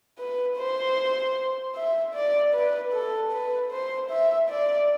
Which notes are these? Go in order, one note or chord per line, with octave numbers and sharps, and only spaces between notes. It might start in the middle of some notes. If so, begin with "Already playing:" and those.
B4
C5
E5
D5
B4
A4
B4
C5
E5
D5